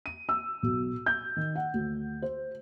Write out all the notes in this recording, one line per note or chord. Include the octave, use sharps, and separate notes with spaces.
D#7
E6
B1
G6
D#3
F#5
D2
C5